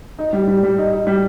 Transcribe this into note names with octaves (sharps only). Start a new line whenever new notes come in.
D#4
G3
G3
G3
D#4
D#4
G3